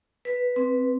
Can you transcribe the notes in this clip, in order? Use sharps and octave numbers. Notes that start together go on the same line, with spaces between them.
B4
C4